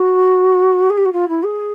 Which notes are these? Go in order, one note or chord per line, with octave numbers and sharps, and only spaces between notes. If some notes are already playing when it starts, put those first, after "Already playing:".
Already playing: F#4
G#4
G4
F#4
F4
E4
G#4